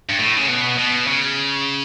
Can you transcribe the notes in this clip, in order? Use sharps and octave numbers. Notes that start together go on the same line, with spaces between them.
G2
A2
C#3
B2
B2
C#3